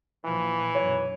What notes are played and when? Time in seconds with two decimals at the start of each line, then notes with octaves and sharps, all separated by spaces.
0.25 A#1 A#2 E3 F3
0.75 B1 F#2 C#5